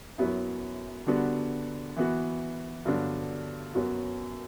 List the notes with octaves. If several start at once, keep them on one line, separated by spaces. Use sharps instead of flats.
F#2 F#3 B3 E4
D3 G3 B3 D4 F#4
E3 B3 F#4
G2 D3 F#3 B3 D4
F#2 F#3 B3 F#4